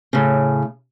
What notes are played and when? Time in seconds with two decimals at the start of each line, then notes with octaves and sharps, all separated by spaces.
0.13 A2 C#3